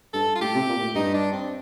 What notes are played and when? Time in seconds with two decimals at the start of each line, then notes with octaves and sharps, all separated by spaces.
0.13 G2 A4
0.35 F4
0.41 A2 G4
0.55 C3
0.69 A#2
0.81 A2
0.95 G2 D#4
1.14 D4
1.32 C4